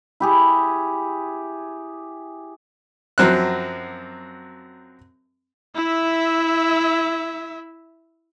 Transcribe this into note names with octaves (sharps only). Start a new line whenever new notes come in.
E4 G4 G#4
F#2 F3 F#3 C4 F6 F#6
E4 E5